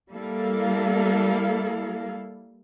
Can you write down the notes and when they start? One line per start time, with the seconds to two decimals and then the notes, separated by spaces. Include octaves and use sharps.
0.11 G3 A#3 E4 A4 F5